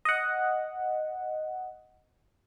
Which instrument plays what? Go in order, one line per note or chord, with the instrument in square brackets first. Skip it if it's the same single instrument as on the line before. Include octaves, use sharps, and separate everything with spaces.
[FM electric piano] D#5 F#5